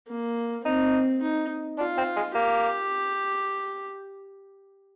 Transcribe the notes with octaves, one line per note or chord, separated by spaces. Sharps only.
A#3
C4 D#4
D#4
D4 F4
C4
G#3
A#3 G4